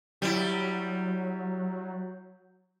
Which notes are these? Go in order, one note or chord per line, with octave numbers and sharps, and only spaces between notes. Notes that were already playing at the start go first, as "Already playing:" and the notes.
F#3 G3 E4